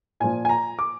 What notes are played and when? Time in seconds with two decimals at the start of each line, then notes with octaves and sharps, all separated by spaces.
0.20 A#2 F3 G#5
0.45 G#5
0.49 A#5
0.79 D6